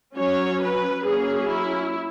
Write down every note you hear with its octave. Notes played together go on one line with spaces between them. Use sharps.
F#3 C#4 C#5
B4
F#3 A#3 C#4 G#4
E4